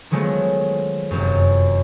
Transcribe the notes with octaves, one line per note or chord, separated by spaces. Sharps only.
D#3 F3 F#3 G#3 A3 B3
F1 F#2